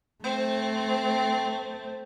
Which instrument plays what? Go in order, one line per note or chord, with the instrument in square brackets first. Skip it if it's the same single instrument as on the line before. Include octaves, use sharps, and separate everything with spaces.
[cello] A3 [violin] C4 [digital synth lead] C5